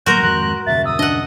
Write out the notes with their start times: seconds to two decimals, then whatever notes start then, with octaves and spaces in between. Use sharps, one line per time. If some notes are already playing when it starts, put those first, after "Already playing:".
0.06 D1 F#3 A#3 F#4 A#4 C6 G6
0.22 G#1 F2 G#3 C6 F#6
0.66 D#1 F#2 C#3 E5 A6
0.86 D#6 E6
0.99 D4 D#5 F#5